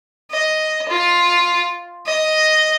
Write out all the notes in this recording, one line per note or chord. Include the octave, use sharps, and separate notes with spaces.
D#5
F4
D#5